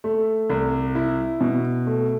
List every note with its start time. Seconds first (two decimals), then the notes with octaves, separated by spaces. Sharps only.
0.04 A3
0.50 C2
0.95 E4
1.41 B2
1.87 A3